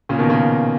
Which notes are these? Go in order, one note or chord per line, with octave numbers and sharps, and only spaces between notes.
A#2 C#3
B2 D#3
A#2 C#3